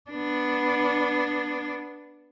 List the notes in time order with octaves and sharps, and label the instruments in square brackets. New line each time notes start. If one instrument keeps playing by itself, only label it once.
[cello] B3 D4